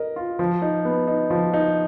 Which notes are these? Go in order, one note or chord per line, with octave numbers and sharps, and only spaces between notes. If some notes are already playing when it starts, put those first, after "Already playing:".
Already playing: A#4 D#5
F4
F3
D#4
B3
D#4
F3
D#4